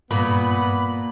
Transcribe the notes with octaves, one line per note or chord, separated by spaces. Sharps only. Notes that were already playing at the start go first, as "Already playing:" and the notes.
G2 A#2 B3 B5